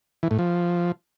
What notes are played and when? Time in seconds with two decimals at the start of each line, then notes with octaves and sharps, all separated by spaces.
0.23 E3
0.31 A2
0.39 F3